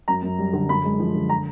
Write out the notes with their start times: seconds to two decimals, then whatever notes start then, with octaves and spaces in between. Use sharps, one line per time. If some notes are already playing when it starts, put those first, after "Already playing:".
0.08 F#2 A#5
0.23 F#2
0.39 G3
0.53 D3
0.69 F#2 B5
0.84 G#3
1.00 F3
1.15 D3
1.29 A#5